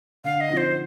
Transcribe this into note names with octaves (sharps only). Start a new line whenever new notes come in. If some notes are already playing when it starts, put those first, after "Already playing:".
D3 F5
D#5
F3 C4 D#4
C5